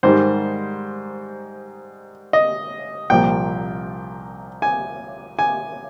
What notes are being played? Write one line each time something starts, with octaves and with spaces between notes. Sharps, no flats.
G#2 D#3 G3 C5
D#5
C2 A#2 F3 G5
G#5
G#5